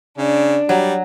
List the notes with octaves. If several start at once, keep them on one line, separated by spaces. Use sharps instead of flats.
C#3 D4
F#3 G3